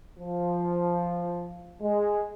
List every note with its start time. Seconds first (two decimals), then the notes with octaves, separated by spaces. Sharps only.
0.18 F3
1.79 G#3